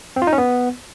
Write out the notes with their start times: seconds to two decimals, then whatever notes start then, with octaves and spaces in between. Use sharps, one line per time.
0.16 C4
0.22 F4
0.27 D#4
0.33 C#4
0.38 B3